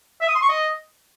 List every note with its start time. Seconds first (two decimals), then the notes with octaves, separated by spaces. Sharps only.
0.21 E5
0.28 D#6
0.35 C6
0.42 C#6
0.49 D#5